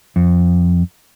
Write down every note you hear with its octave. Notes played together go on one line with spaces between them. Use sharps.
F2